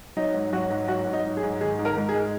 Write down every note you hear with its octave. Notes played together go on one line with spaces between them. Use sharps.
F#3 D#4
G#2
F#3 F#4
G#2
F#3 F#4
G#2
D#4
F#3
G#4
G#2
D#3 G#4
G#2
A#4
G#2
G#4
G#3